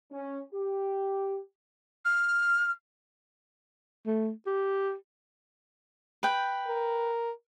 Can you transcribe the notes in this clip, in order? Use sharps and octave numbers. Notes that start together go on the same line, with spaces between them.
C#4
G4
F6
A3
G4
B4 G5
A#4